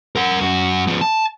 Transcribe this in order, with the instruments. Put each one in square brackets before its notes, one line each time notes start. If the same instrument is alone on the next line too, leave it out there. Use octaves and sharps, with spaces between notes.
[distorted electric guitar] A#4 F#5
F#2 F#4
F3 B3
A5